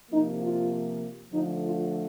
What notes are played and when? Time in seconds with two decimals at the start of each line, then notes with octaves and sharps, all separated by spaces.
0.12 C3 F3 A#3 D#4
0.42 F4
1.32 D3 F3 A3 D#4
1.63 F4